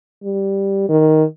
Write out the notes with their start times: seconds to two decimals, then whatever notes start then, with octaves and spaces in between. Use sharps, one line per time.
0.23 G3
0.89 D#3